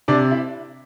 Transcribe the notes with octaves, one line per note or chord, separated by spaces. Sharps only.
C3 D4 D5
E4 E5